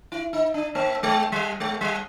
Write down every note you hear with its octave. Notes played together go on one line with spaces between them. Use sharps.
E4
D#4
D4
A#3
G#3
G3
G#3
G3